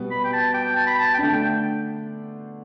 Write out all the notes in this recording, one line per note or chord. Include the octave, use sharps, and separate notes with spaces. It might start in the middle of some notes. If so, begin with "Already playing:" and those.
Already playing: B2 G3 B3
B5
G5
A5
G5
A5
B5
A5
G5
D3 A3 D4 A5
G5